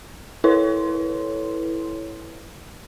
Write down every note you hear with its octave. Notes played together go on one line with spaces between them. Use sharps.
E4 A4 B4 C#5 C6